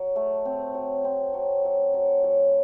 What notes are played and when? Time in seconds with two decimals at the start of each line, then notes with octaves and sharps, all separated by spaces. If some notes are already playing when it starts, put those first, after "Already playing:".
Already playing: F#3
0.16 A3
0.45 C4
0.75 F#3
1.05 C4
1.34 F#3
1.65 F#3
1.94 F#3
2.24 F#3